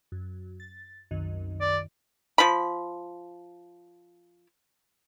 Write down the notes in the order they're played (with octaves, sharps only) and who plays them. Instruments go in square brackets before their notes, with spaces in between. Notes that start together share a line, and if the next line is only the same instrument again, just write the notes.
[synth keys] F#2
A6
C2 F#2 D#3
[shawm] D5
[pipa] F3 B5